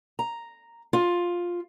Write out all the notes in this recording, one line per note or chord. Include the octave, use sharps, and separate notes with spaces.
A#5
F4